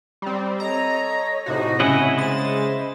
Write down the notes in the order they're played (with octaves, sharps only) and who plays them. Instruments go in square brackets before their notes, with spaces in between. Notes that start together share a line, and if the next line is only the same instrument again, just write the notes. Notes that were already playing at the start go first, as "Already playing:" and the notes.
[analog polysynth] G3 C4
[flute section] A4 C#5 D#5 [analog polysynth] A#5
[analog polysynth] A2 C3 F#4 [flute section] D#4 C5 D#5
[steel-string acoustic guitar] C#3 [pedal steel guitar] E4 D#5 F#5 [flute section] E5 G#5
[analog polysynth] G#3 A6 [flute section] C5